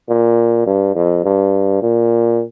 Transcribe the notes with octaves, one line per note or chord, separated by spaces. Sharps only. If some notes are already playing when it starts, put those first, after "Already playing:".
A#2
G2
F2
G2
A#2